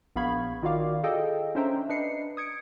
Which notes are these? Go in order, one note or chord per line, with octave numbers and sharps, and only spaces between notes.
A#1 B3 F5 B5 C#6 G#6
D#3 F4 F#4 D5 F5 D6
G#4 A4 D#5 F5 G5
C#4 D4 C5 E5 G5 A#5
D4 B4 D#5 C7 C#7
D#6 G#6 C#7 D7